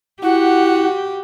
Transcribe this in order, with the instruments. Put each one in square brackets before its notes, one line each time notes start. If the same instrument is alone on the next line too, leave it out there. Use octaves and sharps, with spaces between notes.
[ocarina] E4 [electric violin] F#4 [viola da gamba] G4 [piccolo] F#5